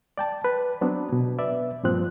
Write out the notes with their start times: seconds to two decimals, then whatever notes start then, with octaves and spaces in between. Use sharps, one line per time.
0.18 D5 G5 A5
0.44 B4
0.81 F#3 B3 C4 D4
1.13 B2
1.38 B4 D5 E5
1.83 G2 A#2 F3 C4 F#6